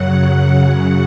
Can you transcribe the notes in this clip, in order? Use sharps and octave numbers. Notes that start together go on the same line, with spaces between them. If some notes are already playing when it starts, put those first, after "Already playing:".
Already playing: F#2 C#3 F#3 F#5
F#5
F#5